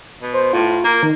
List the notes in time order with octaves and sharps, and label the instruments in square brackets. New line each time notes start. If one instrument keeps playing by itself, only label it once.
[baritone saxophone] B2
[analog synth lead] C5
[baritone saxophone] A2 [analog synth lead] F4
[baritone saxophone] A#3 [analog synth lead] A#4
[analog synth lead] D#3